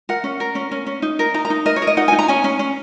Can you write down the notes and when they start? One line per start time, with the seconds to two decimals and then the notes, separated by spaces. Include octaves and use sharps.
0.09 A#4 F#5
0.24 C#4
0.40 A#4
0.55 C#4
0.71 C#4
0.87 C#4
1.02 D#4
1.19 A#4
1.34 D#4 A#5
1.45 A#5
1.50 D#4
1.66 A#4 D#5
1.76 C#5
1.82 A#4
1.87 D#5
1.97 D#4 F#5
2.08 G#5
2.12 D#4
2.19 A#5
2.28 C#4 G#5
2.44 C#4
2.59 C#4